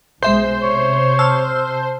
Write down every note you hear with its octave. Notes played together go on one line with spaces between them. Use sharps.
B1 G#3 C5 E5 C6 G6
C3 C#5
A5 E6 F6